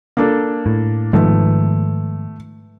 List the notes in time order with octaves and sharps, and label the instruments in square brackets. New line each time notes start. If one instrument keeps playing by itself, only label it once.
[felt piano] A#3 D4 A4
[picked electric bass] A2
[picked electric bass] G#2 D#3 F3 [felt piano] A3 B3